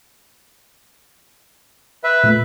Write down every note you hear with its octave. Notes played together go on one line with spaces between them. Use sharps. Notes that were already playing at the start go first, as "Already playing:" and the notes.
B4 E5
A#2 A3